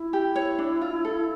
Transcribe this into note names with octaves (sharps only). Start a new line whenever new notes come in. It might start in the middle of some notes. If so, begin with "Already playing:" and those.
Already playing: E4
G4
C#5
D4
F4
A4